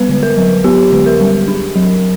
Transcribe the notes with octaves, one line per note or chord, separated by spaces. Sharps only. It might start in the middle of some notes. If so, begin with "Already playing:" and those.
Already playing: G3 B3 B4
D3
A#4
F#3
B3 G4
D3
A#4
G3
D4
F#3